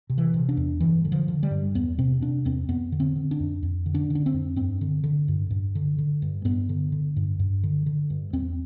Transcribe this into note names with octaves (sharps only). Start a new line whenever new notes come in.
C3
E3
C3
D4
E2
G2 E3
D3
F3
D3
G3
G2
E2 B3
C3 C4
C3 D4
E2 C4
F2 B3
D3
C4
D3
D4
F2
F2
D3
D4
D3 D4
C4
F2
G2 C4
D3
D3
G2
G2
D3
D3
G2
G2 B3
D3
D3
G2
G2
D3
D3
G2
E2 C4